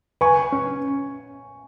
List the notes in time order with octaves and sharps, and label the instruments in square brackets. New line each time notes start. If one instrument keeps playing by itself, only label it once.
[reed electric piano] B4 [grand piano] G#5 C#6
[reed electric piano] C#4